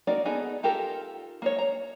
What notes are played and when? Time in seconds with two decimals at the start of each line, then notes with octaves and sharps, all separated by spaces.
0.07 A#3 D#4 F#4 A#4 D5
0.25 B3 D#4 G#4 A4
0.63 D#4 F4 G4 A4 A#4
1.42 A#3 D#4 C#5
1.58 A#5